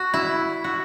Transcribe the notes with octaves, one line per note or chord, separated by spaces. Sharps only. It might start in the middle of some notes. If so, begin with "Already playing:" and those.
Already playing: F#4
E4
F#4